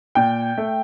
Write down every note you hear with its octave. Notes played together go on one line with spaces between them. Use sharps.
A#2 G5
A3